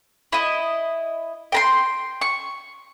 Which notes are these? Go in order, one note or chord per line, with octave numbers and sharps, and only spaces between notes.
E4 D#5
G5 A#5 C6
C#6